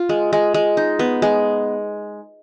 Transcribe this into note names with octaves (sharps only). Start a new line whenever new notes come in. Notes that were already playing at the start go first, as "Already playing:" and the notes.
Already playing: F4
G#3
G#3
G#3
D#4
B3
G#3